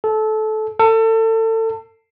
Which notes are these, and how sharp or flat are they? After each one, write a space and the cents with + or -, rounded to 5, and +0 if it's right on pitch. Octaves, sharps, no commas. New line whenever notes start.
A4 -20
A4 +30